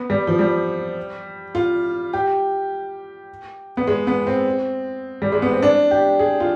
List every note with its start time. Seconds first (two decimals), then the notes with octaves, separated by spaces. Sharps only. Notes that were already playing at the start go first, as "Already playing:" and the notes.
Already playing: B3
0.10 G3
0.27 F3
0.39 G3
1.55 F4
2.13 G4
3.77 B3
3.87 G#3
4.07 B3
4.27 C4
5.22 G3
5.32 G#3
5.42 B3
5.52 C4
5.62 D4
5.91 G4
6.19 G#4
6.40 F4